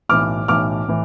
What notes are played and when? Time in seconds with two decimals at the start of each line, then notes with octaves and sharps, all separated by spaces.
0.09 B1 A2 E3 D6 F6
0.48 B1 A2 E3 D6 F6
0.88 A2 E3